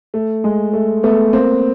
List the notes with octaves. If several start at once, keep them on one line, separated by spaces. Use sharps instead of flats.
A3
G#3
A3
A3 B3
A#3 C4